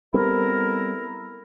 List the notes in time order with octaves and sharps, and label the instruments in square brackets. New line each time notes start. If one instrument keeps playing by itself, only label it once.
[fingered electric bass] G3 B3 C4 [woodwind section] E4 A4 A#4